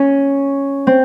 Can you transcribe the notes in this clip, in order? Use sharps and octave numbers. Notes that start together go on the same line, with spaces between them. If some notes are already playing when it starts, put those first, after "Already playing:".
Already playing: C#4
C4